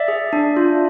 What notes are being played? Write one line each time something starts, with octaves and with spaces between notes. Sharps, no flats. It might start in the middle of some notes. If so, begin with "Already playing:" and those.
Already playing: D5 E5
G#4
D4
F4